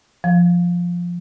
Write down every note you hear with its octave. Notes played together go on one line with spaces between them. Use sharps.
F3